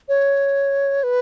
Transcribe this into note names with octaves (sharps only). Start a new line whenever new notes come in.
C#5
B4